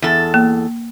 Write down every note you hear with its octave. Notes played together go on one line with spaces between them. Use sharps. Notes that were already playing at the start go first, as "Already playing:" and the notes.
E2 A4
A#3